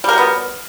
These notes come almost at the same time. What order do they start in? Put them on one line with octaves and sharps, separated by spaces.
G3 A#4 F#3 B3